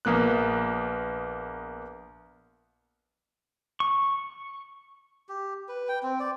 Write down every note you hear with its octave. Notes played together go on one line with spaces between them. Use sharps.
A#1 A#3 B3 F#6
C#6
G4
B4
G5
C4
D5